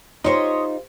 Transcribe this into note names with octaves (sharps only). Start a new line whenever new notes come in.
D#4 F4 G4 C5 C#5 D#5